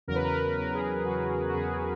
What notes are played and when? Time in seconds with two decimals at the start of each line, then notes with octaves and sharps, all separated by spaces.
0.08 E2 C#3 F#3 A#4
0.16 B4
0.24 A#4
0.32 B4
0.57 E2 C#3 F#3 B4
0.74 G#4
0.81 A#4
1.05 E2 C#3 F#3 F#4
1.49 F#4
1.54 E2 C#3 F#3 G#4